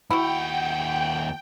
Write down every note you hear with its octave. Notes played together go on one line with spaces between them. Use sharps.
D#2 E4 F#4 F#5 G5